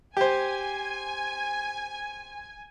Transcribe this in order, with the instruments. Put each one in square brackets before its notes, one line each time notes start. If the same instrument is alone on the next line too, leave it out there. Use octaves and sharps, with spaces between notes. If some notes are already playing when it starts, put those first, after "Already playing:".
[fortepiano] G4 C5 [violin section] G#5